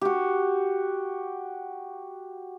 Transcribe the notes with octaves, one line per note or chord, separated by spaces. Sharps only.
F#4 G4